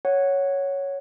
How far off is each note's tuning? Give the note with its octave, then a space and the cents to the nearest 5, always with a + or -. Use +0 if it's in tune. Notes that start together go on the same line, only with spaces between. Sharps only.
C#5 +0 F#5 +0